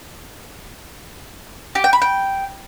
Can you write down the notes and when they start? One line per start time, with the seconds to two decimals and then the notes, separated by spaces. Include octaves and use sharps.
1.75 G4
1.84 G5
1.93 B5
2.02 G5